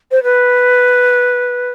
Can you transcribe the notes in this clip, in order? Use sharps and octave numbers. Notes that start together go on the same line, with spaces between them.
C5
B4